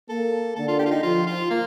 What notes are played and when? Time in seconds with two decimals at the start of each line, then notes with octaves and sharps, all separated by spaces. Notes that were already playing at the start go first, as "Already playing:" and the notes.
0.09 A#3 A4
0.56 D3 A4
0.68 F4
0.79 G4
0.86 F4
0.91 D#4
1.03 F3 F4
1.27 F4
1.50 A#3